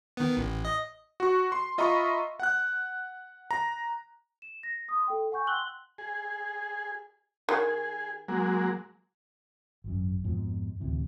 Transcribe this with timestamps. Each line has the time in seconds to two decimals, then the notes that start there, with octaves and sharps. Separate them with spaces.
0.17 D#3 B3
0.37 A1
0.65 D#5
1.20 F#4 C#6
1.52 C6
1.78 F4 D#5 E5 A#5 B5 C#6
2.40 F#5 F#6
3.51 A#5
4.42 E7
4.63 A#6
4.89 C6 D#6
5.08 A4 G5
5.32 F#5 G#5 C#6 G6
5.47 G5 C6 E6 F#6 F#7 G7
5.98 G#4
7.49 D#3 G#4
8.28 F#3 G#3 A#3
9.84 G#1 F#2
10.24 F2 G#2 B2 F3
10.80 D2 A2 C3 E3